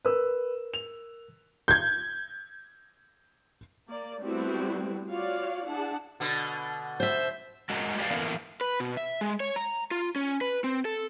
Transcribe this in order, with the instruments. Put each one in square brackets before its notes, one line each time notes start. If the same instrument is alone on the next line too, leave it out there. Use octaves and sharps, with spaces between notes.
[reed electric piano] A#4 [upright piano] B4 E6
[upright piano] F7
[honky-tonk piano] G6 G#6
[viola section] A#3 D5
G3 A3 B3 C4 E4 F#4
F4 F#4 C#5 D5 F5
D4 E4 G#4 F#5 A5
[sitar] B2 D3
[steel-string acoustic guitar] C5 E5
[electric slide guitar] G#3 F#4 A#4
G4 G#4 B4 D5 E5 F5
D3 E3 A#3 B3 A#4
B4
B2
E5
G#3
C#5
A#5
F4
C#4
B4
C4
A4